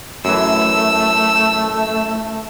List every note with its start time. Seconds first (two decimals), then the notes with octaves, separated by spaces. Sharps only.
0.25 F#2 E3 A3 E6